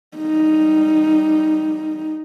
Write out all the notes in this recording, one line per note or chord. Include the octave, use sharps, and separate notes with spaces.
G3 D#4